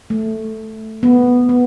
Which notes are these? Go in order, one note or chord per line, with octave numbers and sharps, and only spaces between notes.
A3
B3
B3